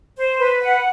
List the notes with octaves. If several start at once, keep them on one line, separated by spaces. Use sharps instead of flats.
C5
B4
F#5